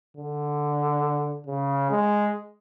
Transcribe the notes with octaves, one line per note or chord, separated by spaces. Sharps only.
D3
C#3
G#3